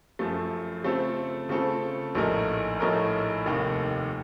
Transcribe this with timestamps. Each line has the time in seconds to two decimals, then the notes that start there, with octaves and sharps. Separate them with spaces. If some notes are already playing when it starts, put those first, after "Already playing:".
0.19 F#2 F3 A3
0.84 C#3 A3 C4 F4 A4
1.49 C#3 A3 C4 F4 A4
2.15 A#1 A2 A3 D#4 A#4
2.80 A#1 A2 A3 D#4 A#4
3.46 F1 D#2 D#3